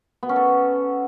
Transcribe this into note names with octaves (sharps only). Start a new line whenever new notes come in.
B3
C#4
A4